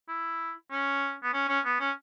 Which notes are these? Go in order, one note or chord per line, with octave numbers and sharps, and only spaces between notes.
E4
C#4
B3
C#4
C#4
B3
C#4